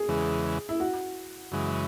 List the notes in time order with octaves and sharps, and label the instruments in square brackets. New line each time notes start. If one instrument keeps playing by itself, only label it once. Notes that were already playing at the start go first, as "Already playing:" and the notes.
Already playing: [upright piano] G#4
[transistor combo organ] E2 C#3 E3 G#3
[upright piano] E4
F#4
[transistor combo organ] F#2 C#3 E3 G#3